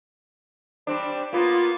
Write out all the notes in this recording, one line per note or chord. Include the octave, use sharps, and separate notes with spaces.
G3 C4 D4
A#3 B3 F4